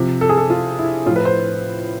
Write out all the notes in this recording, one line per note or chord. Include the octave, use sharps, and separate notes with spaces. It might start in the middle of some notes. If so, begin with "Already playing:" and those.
Already playing: C3 F3
A4
G#4
A4
F4
E4
A2 F3 F4
B4
C5